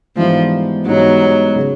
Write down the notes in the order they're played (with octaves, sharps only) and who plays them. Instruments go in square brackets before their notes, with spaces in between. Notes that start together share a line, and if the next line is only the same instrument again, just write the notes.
[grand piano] G#2 E3 G3 B3 D#4 [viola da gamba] F3
[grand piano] G#2 E3 G3 B3 D#4 [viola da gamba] F#3
[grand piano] C#3 F#3